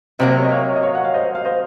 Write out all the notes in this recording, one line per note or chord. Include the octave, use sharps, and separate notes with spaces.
C3 F#3 A#3 C5 D#5
C#5
D#5
C#5 F5
D#5
C#5 F5
F#5
F5
C5 D#5
F5
C5 D#5